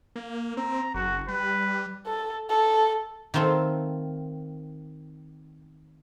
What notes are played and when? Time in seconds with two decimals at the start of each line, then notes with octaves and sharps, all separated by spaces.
0.16 A#3
0.57 C4 A#5
0.95 F#1 F#4
1.28 G3 B4
2.06 A4
2.50 A4
3.34 D#3 A3 C4 F4 A4